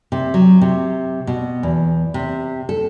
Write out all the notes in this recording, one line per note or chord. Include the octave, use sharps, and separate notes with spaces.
C3
F#3
C3
B2
E2
C3
A4